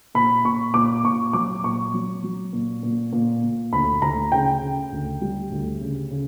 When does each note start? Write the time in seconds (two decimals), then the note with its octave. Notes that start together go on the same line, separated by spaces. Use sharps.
0.15 A#2 B5
0.44 A#2 C#6
0.74 A#2 D6
1.04 A#2 C#6
1.33 F#3 D6
1.63 A#2 C#6
1.94 F#3
2.24 F#3
2.53 A#2
2.83 A#2
3.13 A#2
3.43 A#2
3.73 D2 B5
4.02 D2 A#5
4.32 C#3 G5
4.62 C#3
4.92 D2
5.21 G3
5.51 D2
5.81 C#3
6.10 C#3